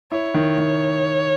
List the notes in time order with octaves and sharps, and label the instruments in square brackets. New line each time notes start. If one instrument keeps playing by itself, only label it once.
[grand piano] E4 [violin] C#5
[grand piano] D#3
D#3